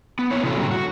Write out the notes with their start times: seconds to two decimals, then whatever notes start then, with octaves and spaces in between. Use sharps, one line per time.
0.19 B3
0.31 A#3 B3 E4 C#5
0.43 C3 E3 C#4 F#4 A4
0.57 A2 D3 F#3 G3
0.71 F#4